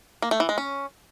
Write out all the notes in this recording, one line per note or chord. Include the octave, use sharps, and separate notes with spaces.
A#3
A3
E3
G#3
C#4